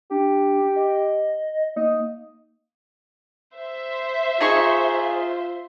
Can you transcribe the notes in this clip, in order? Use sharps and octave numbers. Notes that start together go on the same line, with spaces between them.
D4 G4
D#5
A#3 D#4
C5 E5 C6
D#4 F4 G#4 C#6